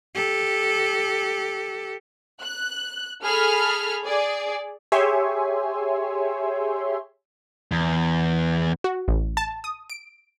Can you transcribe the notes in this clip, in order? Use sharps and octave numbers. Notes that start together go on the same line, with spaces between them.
G4 A4
F#6
G#4 A4 B5 F6
G#4 D5
G4 G#4 C#5 E5 G#5 C6
E2
F#4
A1
A5
D#6
D7